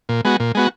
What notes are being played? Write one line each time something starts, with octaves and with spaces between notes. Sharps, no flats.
A#2
G#3 B3 F#4
A#2
G#3 B3 F#4